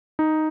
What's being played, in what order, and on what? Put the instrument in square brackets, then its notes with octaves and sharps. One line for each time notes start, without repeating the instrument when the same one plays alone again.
[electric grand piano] D#4